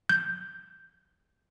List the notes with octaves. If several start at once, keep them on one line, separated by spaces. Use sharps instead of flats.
G6